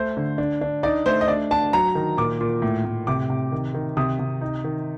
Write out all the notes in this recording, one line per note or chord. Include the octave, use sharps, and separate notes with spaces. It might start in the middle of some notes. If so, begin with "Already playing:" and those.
Already playing: A3 C5
D3
D4
D4
D#4 D5
A3 C5
D#5
D4 D5
D4 A5
F#3 A#5
D#3
A#2 D6
A#2
A2
A2
C3 D6
C3
D#3
D#3
C3 D#6
C3
D#4
D#3